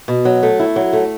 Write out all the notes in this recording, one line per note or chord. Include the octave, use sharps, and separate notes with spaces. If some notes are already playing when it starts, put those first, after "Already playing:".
B2
F#3
A3
E4
F#3
A3